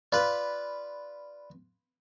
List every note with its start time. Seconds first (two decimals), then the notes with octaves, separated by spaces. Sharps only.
0.12 F4 B4 D5 B5